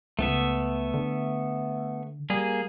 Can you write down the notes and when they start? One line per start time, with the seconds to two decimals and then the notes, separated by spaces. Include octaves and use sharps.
0.19 C#2 A3 B3 E5
0.94 D3
2.30 G3 A#3 G#4